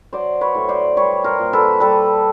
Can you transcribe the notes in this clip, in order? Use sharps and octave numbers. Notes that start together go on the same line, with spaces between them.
F#3 C5 D5
B4 C#5
A2
C5 D5
G3 B4 C#5
A#4 C5
A#2
A4 B4
G3 A4 B4